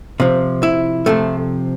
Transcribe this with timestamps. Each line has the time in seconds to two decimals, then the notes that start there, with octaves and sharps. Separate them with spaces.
0.20 C3 F3
0.63 E4
1.06 C3 F3 A3